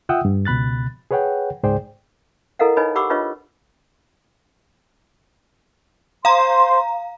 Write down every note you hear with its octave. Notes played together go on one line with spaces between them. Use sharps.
F4 E5 F#5 G5 D#6 E6
G2
C#2 B2 B5 F#6 A6
G#4 B4 C#5 F#5 G5
C#2 G#2 G#4 C5 D5 G5
E4 A4 A#4 D#5 F5 F#5
D#4 B4 C#5 D#5 G#5 B5
G4 F#5 B5 C#6 D6 E6
D4 F4 B4 C#5 D#5 C#6
C5 F5 A#5 C6